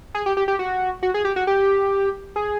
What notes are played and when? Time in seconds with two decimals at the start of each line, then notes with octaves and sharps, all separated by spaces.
0.15 G#4
0.26 G4
0.37 G4
0.48 G4
0.59 F#4
1.03 F#4
1.14 G#4
1.25 G4
1.36 F#4
1.47 G4
2.36 G#4